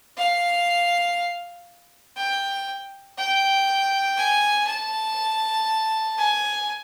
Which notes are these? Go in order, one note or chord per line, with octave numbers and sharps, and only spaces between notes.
F5
G5
G5
G#5
A5
G#5